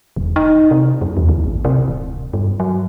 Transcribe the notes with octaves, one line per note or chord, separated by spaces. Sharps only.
E1
D#4
C3
F#2
E2
D2
G#1
C3
D1
G2
F#3